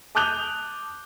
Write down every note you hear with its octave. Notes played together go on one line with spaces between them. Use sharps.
A5 D6 D#6 F#6 G6 F7